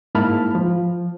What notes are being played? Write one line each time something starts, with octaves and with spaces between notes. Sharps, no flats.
G#2 A#3 E4 A5 B5 F6
F3